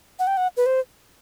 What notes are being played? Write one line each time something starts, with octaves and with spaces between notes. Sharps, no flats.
F#5
G5
F#5
B4
C5